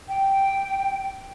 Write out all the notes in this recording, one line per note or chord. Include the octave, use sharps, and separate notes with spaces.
G5